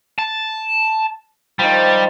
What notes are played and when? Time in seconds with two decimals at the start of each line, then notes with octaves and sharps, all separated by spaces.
0.19 A5
1.59 D#3 F3 G3